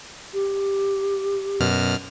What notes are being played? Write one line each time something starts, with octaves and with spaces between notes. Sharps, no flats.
G4
F#2 B2 F6